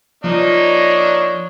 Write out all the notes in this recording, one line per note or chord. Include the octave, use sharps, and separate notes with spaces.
F3 A#3 D4 D#4 C#5